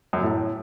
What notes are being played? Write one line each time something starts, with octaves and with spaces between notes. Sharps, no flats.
F#2
F#3
A2